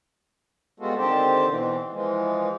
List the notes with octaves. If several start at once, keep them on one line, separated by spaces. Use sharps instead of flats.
G3 G#3 B3 F4 F#4 A4
D3 D#3 C4 G4 C5 A5
B2 E3 C4
E3 F3 G#3